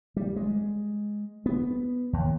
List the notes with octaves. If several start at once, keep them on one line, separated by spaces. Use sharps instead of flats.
G3
G#3
B3
D#2